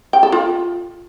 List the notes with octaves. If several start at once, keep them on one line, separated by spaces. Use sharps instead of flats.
G5
A4
F4